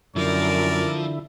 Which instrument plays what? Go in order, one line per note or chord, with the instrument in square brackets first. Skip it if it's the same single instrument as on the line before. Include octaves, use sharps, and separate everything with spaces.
[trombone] F#2 [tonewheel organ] D3 E4 [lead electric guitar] F3 [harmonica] A#4 D5